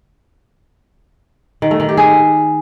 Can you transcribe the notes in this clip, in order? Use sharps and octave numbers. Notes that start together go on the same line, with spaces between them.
D#3
A3
D#3
G4
G#4